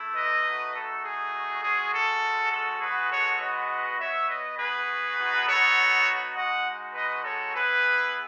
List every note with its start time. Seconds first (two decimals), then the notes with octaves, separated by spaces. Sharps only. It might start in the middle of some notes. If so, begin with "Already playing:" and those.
Already playing: A3 E4
0.15 B4 D#5
0.44 A3 D#4 F#4
0.74 A4
1.04 G#4
1.62 G#3 C#4 F#4 G#4
1.92 A4
2.51 A4
2.81 G#3 B3 F#4 G#4 B4
3.10 A4 C#5
3.40 B4 D#5
3.99 B3 F#4 C#5 E5
4.29 B4 D#5
4.58 G#4 B4
5.18 B3 D#4 F#4
5.47 A4 C#5
6.36 G#3 D#4 F#4 D#5 F#5
6.94 B4 D#5
7.24 A4 C#5
7.54 B3 E4 G#4 B4